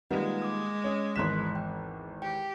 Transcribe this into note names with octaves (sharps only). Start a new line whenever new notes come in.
D#3 G3 G#3 A#3 F4 B4 F#5
D6 D#6
C#4
G#1 E2 C6 F#6 B6 E7
G5
G4 G5